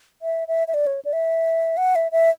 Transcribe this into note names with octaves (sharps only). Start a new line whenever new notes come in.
E5
E5
E5
D5
C#5
D5
E5
F#5
E5
E5